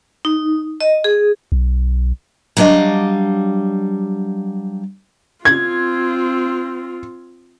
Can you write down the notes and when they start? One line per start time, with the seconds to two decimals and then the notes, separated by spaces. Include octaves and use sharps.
0.25 D#4
0.81 D#5
1.04 G#4
1.52 B1
2.57 F#3 G3 D4 C5 D#5 F5
5.45 C4 F4 G#6